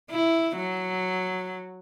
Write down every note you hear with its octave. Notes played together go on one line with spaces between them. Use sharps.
E4
F#3